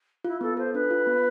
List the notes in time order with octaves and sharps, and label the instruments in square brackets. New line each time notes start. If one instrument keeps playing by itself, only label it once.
[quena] E4 [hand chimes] F4
[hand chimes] B3 [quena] A4
[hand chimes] A4 [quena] C5
[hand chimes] D4 [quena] B4
[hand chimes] F4
B3